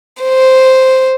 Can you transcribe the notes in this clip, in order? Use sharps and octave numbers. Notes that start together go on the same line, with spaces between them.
C5